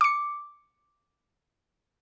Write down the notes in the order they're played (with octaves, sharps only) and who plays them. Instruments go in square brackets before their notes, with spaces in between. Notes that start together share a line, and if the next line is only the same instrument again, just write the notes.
[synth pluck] D6 C#7